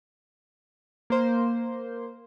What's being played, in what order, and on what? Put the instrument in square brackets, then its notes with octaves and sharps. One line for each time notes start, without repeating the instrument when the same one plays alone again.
[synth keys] A#3 C5